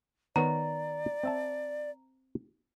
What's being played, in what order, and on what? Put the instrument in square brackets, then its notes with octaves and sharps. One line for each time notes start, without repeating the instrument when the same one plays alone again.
[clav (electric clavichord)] D#3 B3 C#5 [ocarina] D5 [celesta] A#5
[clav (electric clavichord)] C4 E5 A5